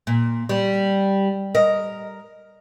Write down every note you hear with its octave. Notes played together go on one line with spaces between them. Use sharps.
A#2
G3
A#4 D#5